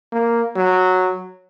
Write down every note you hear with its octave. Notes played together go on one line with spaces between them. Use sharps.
A#3
F#3